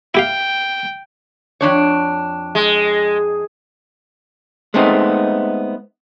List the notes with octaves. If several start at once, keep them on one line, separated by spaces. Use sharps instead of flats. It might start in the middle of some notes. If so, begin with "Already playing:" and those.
E4 G4 F5 G5
F2 D4 C#5
G#3
G#3 A3 B3 C4 D#4